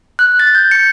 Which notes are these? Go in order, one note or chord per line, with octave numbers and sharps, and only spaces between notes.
F#6
A6
G6
C#7